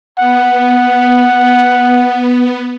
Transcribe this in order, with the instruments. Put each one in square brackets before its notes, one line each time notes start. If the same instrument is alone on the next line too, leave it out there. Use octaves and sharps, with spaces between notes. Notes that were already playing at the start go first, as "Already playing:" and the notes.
[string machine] B3 [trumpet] F#5